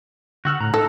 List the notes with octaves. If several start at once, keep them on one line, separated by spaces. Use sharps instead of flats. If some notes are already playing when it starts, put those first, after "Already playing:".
D3 F#4 F#5 E6 F6
A2 A#5
D#4 A4 A#5 E6